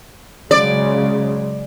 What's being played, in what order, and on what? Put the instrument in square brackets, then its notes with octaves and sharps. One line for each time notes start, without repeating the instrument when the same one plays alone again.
[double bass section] C#3 F#3 G#3 [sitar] D5